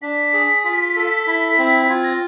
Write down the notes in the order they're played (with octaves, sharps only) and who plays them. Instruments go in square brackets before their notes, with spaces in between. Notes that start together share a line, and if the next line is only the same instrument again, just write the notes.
[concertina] D4 [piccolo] B6
[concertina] G#4
F4
A4
E4
C4
[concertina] F4 [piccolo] G#6
[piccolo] A#6